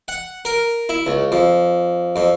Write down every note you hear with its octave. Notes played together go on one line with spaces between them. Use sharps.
F#5
A#4
E4
C#2
F2
F2